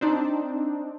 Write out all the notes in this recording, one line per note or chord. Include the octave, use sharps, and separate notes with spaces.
C4 D4 D#4